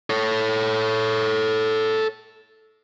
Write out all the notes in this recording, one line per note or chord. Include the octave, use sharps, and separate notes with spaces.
A4 C#5